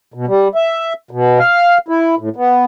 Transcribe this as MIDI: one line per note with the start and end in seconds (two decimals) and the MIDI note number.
0.14 0.26 47
0.27 0.48 55
0.55 0.93 76
1.11 1.39 47
1.39 1.78 77
1.88 2.15 64
2.19 2.29 45
2.36 2.65 59